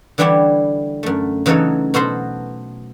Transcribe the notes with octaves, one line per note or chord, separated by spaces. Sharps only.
D3 E3 G3 E4 G4 C#5
F#2 A3
C#3 E3 F#3 D#4 A4 C#5
B2 F#4 A4 C5 C6